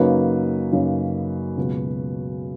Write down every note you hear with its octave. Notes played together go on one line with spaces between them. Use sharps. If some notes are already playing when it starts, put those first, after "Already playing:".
Already playing: F#2 C#3 F#3 A#3 D#4 B4
F#2 C#3 F#3 A#3 D#4
C#2 B2 F#3